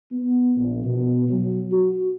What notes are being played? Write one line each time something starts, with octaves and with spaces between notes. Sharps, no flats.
B3
A#1
B2
F#3
F#4